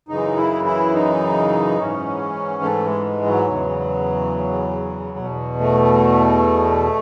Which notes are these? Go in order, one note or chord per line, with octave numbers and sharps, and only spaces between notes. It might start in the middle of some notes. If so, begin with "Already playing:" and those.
F#2 C#3 E3 D#4
E4
E4
D#4
G#2 E3 C#4
A3
G#3
G#3
F#3
E2 C#3 E3
E2 B2
A3